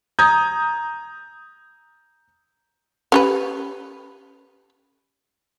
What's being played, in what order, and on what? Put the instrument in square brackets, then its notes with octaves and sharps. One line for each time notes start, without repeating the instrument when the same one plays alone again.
[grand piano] A#5 D#6 G6 G#6
[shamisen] C#4 G4 B4